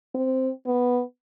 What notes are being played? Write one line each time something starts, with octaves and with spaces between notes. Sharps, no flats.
C4
B3